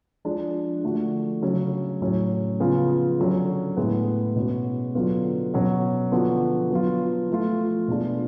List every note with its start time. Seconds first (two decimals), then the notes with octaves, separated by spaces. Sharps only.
0.25 F3 G#3 D4
0.84 D3 F3 A3 D4 F#4
1.42 C#3 F#3 C#4
2.01 A2 F#3 C#4
2.60 C#3 F3 B3 F4
3.19 D3 F#3 C#4
3.77 A2 G#3 B3
4.36 B2 G#3 C#4 F#4
4.95 D3 F#3 B3 F4
5.54 B2 F#3 C#4 F#4
6.12 D3 F3 B3 F#4
6.70 F#3 B3 F4
7.30 F3 A3 F4
7.88 B2 G#3 D4 F4